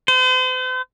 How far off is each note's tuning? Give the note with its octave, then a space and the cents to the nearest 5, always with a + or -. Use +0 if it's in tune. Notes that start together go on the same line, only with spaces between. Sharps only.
C5 -45